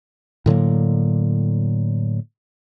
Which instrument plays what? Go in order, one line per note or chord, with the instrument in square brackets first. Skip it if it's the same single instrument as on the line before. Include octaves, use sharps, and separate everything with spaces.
[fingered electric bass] A2 D3 F#3 A#3